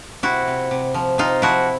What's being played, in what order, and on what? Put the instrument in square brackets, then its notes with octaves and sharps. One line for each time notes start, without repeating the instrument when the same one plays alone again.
[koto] C3 E4 F#4
C3
C3
F3
C3 D#4 F4
F3 E4 F#4